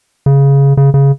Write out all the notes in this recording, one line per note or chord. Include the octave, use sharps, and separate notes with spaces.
C#3
C#3
C#3